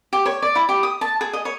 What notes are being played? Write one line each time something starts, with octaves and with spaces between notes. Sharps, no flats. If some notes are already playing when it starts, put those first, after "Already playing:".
G4
C#5
D5
E4
G4
D#6
A5
G#4
D#5
C#5